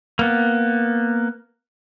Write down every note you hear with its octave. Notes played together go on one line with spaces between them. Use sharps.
A#3 B3